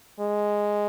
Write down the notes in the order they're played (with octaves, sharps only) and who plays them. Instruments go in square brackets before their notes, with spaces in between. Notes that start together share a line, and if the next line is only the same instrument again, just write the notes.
[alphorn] G#3